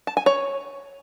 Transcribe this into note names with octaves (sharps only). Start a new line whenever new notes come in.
A5
G#5
C#5